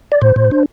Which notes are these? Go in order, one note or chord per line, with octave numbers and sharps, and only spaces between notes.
D5
A2 C5
A2
D4